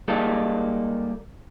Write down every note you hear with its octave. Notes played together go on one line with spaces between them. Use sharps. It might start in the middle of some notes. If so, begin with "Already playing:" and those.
G3 G#3 A#3 D#4 G4 A4